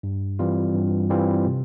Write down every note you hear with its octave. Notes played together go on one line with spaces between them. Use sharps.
G2
E3 G3 C4 F4
G2
E3 G3 C4 F4
C3